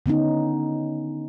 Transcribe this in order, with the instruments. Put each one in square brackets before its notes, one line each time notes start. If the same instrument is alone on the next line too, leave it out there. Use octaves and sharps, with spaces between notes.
[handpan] D3 B3 C#4 D#4